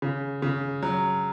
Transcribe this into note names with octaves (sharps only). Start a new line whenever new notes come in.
C#3
C#3
F#3